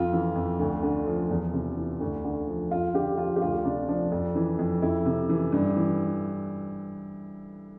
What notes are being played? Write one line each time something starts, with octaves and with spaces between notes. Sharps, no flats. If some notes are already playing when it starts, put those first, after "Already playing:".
Already playing: F2 F4
E3
F2
D2
D3
F3
E2
C3
E3
D2
D3
F3
F2 F4
D3 G4
F3 F4
G4
D2 F4
C3 D4
F3 D4
F2
E3
F2
F2 E4
C3
E3
G2
E3